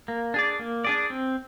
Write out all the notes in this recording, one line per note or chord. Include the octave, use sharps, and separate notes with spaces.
A#3
D4 G#4 D5
A#3
D4 G#4 D5
C4